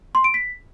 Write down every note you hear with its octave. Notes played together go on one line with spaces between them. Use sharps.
C6
D7
B6